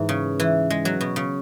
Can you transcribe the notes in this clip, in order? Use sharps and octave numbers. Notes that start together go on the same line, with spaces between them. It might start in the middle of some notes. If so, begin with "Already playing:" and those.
Already playing: G#2 E3
C#3
E3
G#3
F#3
B2
C#3